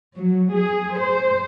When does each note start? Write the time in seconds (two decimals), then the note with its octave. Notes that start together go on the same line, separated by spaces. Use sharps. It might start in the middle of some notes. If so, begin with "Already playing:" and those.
0.15 F#3
0.51 G#4
0.97 C5